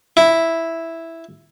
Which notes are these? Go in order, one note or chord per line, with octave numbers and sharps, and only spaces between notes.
E4